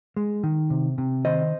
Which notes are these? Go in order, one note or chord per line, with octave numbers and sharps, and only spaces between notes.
G#3
D#3
C3
C3
D#3 C5 D#5